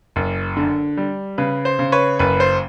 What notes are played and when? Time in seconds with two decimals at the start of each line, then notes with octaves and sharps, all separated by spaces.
0.16 F#1
0.57 D3
0.97 G3
1.38 C#3 B4
1.65 C5
1.79 C#3
1.92 B4 C#5
2.19 F#1 B4
2.40 C5